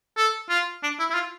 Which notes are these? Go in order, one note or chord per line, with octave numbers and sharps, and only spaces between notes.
A4
F4
D4
E4
E4
F4